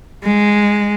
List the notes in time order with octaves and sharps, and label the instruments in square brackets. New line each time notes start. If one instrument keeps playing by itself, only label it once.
[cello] G#3